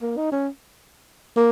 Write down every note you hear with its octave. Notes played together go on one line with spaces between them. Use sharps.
A#3
D#4
C#4
A#3